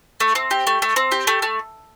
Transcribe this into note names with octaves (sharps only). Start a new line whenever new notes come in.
A3
C4
G4
A3
A3
C4
G4
A3
A3